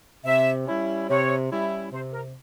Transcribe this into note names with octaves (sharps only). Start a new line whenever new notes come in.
C3 E5
G3 C#4 E4
C3 C#5
G3 C#4 E4
C3 C5
A#4